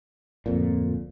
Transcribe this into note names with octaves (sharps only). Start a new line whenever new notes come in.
D1 F2 A#2